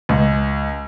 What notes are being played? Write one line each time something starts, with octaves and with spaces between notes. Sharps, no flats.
C#2